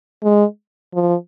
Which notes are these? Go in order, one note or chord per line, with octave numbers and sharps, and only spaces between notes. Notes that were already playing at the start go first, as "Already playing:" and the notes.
G#3
F3